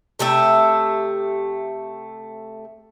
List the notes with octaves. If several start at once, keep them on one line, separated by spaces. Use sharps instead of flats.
C3 A3 G4 E5